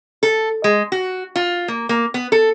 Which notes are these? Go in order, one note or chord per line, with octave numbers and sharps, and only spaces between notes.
A4
G#3
F#4
F4
A#3
A#3
B3
A4